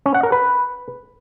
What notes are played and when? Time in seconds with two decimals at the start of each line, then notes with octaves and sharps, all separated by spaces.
0.06 C#4
0.14 F#5
0.23 A#4
0.32 B4